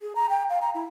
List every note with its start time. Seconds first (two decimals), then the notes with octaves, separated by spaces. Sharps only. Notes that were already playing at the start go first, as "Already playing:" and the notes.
0.01 G#4
0.15 A#5
0.30 G5
0.50 F5
0.62 A#5
0.75 E4